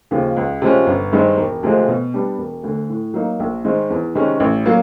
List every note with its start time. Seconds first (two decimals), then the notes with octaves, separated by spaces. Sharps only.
0.11 D#2 C#3 F3
0.37 C#2
0.62 C3 F3 G#3 C#4
0.87 G1
1.13 G2 D#3 G#3 C4
1.37 E1
1.63 D2 C3 F3 G#3
1.88 B2
2.14 G3 B3 D4 G4
2.38 E1
2.64 D2 D3
2.90 A2
3.14 F#3 A#3 D#4
3.40 A#1
3.65 G#2 D#3 G#3 C4
3.90 E2
4.15 C3 D#3 G#3 C#4
4.40 A1
4.66 F#3 A#3